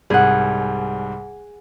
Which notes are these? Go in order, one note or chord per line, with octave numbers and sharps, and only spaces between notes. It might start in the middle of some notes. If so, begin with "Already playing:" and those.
C2 G#2 G3 G#4 F#5